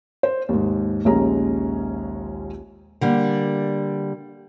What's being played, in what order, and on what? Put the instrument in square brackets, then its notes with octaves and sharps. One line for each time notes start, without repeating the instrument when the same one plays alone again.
[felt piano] C5
D#2 G#2
A#1 D#2 G#3 C#4 G#4 A#5
[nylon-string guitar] D3 G3 A#3